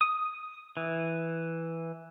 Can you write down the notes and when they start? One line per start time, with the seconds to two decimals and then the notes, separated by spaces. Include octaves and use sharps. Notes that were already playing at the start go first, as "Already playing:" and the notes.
0.01 D#6
0.77 E3